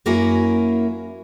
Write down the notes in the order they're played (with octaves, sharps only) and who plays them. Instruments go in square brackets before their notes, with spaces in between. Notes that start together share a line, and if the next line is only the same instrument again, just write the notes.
[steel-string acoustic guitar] F#2 A#3 E4 F#4 A#4 G#5